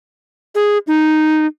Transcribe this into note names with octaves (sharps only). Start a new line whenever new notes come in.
G#4
D#4